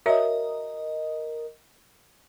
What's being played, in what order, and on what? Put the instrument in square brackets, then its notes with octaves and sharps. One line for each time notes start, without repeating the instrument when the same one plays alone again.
[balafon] F#4 C#5 E5 [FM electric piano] A#4 D#5